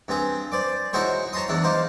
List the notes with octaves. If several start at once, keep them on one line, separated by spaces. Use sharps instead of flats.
G2 C4 G#4
C5 D5 D6
D#4 E4 F#4 G#4 C5 C#5
C#5 A5 A#5 C6 D#6
E2 D4 E4
D#4 C5 F5 D6